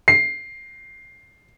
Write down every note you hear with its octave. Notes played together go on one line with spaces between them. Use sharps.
C7